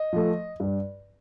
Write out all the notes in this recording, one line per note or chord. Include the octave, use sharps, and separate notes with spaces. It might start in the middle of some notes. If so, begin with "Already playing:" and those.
Already playing: D#5
F3 A3
G2